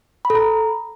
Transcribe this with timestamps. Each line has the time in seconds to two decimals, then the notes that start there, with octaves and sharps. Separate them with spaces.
0.25 B5
0.30 A4
0.35 A#5